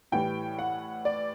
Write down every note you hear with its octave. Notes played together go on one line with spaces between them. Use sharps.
A2 E3 G3 G5
F#5
D5